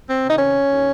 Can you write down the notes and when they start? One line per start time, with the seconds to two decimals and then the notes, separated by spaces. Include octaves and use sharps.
0.09 C4
0.24 C3 D#3 D#4
0.39 C#4
0.68 D#2